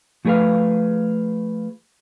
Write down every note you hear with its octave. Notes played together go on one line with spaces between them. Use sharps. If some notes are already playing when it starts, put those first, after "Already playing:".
F3 A3 G#4 A#4 B4 F5